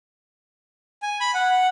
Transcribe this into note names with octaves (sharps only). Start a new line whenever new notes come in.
G#5
B5
F#5